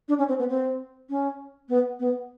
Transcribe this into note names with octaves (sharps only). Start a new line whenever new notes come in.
D4
C#4
C4
B3
C4
C#4
B3
B3